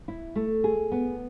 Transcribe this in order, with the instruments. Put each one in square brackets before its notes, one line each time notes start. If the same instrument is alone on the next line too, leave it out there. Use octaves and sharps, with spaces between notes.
[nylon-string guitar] E4
A3
G#4
B3